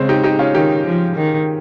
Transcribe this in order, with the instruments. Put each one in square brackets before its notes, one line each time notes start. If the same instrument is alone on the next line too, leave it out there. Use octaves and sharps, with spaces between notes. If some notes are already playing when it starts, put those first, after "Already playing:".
Already playing: [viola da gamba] C#3 [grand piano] G#3 C4
[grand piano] D#4 G4
D#4 G4
C#4 F4
[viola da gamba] D#3 [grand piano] D#4 G4
[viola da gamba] F3
D#3